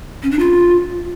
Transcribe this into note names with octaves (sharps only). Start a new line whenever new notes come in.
C#4
D4
F4